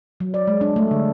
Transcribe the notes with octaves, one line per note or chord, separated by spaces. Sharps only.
F#3
D5
G#3
D4
A3
D3